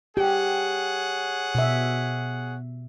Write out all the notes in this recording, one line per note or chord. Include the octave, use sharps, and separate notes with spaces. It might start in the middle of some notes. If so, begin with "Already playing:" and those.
G4 G#4 C#5 F#5
B2 E5